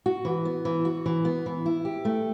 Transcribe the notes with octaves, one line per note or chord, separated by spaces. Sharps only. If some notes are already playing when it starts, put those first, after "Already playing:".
F#4
E3
B3
E3
F#4
E3
B3
E3
E4
G4
A3